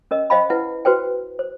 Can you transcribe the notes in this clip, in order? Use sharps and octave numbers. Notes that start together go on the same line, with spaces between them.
C#4 A#4 D#5
C5 D#5 F5 G5 B5
E4 B4 F#5
F#4 B4 C5 G5
C5